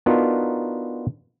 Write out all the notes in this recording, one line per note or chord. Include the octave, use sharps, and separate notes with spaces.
B3 D4 D#4 F4 F#4 A#4